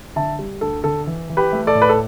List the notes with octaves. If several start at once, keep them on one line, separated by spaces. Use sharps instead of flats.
D3 E5 A5
G3
D2 A4
D3 A4
E3
E3
G4 B4
A3
A4 D5
A2
B4
A4